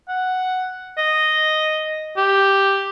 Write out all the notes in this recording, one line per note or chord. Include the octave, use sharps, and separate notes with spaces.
F#5
D#5
G4